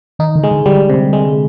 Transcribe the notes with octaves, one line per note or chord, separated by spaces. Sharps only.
D#3 D#4
D3
G#3
D3
D3 G3
C3
G#3